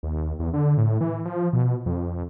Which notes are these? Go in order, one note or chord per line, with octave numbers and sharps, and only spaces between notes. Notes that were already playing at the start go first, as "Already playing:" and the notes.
D#2
E2
D3
A2
E3
F3
B2
F2